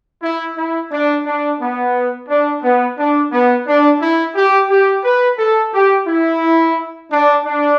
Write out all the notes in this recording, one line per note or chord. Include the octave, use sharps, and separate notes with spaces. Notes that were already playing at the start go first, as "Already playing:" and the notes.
E4
E4
D4
D4
B3
D4
B3
D4
B3
D4
E4
G4
G4
B4
A4
G4
E4
D4
D4